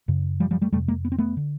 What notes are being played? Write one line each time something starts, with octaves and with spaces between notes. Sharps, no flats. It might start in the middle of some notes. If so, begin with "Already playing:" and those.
F#2 C#3
F3 G3
F3 G3
G3 A3
F2 C3 G3 A3
G#3 A#3
B3
C4
A3 B3
D3